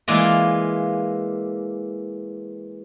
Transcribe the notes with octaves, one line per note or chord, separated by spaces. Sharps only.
E3 G#3 A#3 F4 D5